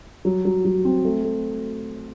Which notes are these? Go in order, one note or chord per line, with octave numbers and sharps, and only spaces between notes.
F#3
F#3
F#3
C4
A3
A3